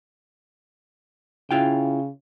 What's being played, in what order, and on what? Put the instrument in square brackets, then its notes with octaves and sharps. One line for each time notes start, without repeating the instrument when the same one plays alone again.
[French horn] C#3 [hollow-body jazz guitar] E4 F4 G5